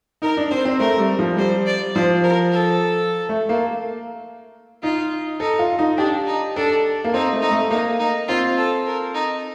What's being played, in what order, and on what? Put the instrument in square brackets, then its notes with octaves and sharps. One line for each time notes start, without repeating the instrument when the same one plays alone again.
[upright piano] D#4 [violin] A#4
[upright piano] D4
[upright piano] C4 [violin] C5
[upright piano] C4
[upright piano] A3 [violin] A#4
[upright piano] G3
F3
[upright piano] G3 [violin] C5
[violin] D5
[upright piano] F3 [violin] C5
[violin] A#4
A4
[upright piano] A3
A#3
[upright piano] D#4 [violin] F4
[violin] D#4 [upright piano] A4
[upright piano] F4
D#4
[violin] D4 [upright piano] G4
[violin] D#4
[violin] D4 [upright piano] A4
[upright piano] A#3
[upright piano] C4 [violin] D#4
[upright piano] A3
[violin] D#4
[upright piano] A3
[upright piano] A#3 [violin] D#4
[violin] D#4
[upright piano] C4 [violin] F4
[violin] A4
A#4
D#4